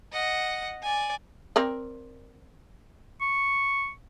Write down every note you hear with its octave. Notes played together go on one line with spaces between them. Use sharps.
D#5 F#5
D5 G#5
C4 A#4 D5
C#6